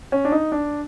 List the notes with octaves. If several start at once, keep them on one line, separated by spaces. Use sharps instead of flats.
C#4
D4
D#4
D4